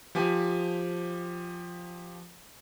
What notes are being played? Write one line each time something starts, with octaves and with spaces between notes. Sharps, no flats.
F3 G4 G#5